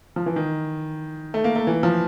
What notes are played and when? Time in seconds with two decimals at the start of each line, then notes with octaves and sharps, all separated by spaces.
0.16 F3
0.26 E3
0.36 D#3
1.34 A3
1.44 A#3
1.56 A3
1.67 E3
1.83 F3